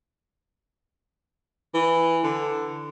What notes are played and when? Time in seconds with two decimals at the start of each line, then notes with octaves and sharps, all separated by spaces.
1.74 E3
2.24 D3